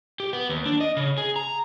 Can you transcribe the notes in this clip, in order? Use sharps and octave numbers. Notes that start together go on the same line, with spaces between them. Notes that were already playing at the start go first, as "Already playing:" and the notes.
G4
B3
D#2
D4
D#5
C#3
G#4
A#5